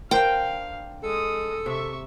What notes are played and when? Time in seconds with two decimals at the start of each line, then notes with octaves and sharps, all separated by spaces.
0.11 D4 A#4 C5 F5 G5
1.03 G#3 A4 D#6
1.66 C3 E5 C#6